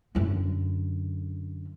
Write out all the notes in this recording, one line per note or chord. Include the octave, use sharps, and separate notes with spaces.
F#2 D3